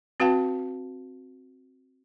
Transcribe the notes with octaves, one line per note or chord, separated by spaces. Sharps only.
C4 F#4 B4 F5 G5 A5